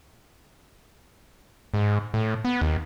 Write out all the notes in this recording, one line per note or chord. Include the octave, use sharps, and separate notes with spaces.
G#2
A2
B3
D#2